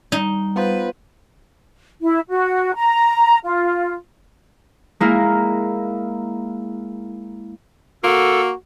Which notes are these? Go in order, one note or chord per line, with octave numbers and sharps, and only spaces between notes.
G3 D#4
B3 F4 B4 C5
E4
F#4
A#5
F4
G#3 A#3 E4 A#4
A#3 F#4 A4